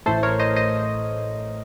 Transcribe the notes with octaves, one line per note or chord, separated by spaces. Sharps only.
A1 A2 A3 A4 C5
A#4 C#5
C5 D#5
C5 D#5